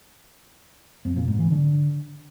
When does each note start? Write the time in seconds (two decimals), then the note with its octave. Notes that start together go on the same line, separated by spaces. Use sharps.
1.05 F2
1.16 A#2
1.28 G#2
1.39 E3
1.50 D3